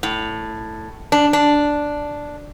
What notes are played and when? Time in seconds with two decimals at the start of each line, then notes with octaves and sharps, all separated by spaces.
0.03 A2
1.12 D4
1.33 D4